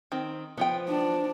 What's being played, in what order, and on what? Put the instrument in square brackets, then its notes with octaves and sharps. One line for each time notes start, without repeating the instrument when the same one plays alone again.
[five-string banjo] D#3 C4
[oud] F3 [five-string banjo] B3 F4 G5
[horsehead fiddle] D4